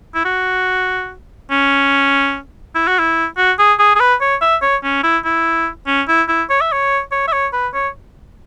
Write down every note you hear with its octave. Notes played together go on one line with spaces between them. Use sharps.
E4
F#4
C#4
E4
F#4
E4
F#4
G#4
G#4
G#4
B4
C#5
E5
C#5
C#4
E4
E4
C#4
E4
E4
C#5
E5
C#5
C#5
E5
C#5
B4
C#5